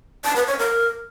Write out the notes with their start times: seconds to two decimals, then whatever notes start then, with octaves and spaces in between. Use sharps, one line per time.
0.24 A5
0.36 B4
0.47 C#5
0.59 A#4